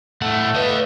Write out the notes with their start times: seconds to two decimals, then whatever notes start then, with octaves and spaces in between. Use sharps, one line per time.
0.22 A2 A3 F#5
0.55 B4 D#5 F5